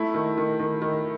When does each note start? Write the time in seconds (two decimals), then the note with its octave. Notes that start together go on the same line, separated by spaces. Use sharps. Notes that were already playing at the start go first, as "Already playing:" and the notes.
Already playing: A3 E4
0.14 D#3
0.38 D#3
0.59 D#3
0.82 D#3